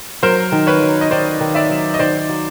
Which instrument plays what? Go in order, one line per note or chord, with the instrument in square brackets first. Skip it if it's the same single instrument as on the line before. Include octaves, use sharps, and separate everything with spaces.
[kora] F#3 [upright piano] A#4 C5
[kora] D#3
[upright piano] B4 C#5
[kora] F#3
[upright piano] D#5
[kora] D#3 [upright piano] C5 D5
[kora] D#3
[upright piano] D5 E5
[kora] F#3
[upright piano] D#5
[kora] D#3 [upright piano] C5 D5
[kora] F#3